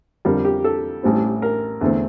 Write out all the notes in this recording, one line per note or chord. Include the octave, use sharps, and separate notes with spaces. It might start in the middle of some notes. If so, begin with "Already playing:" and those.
F2 D3 G3 A#4
G4
A4
A1 A2 G3 C4
A#4
E2 D3 A3 C4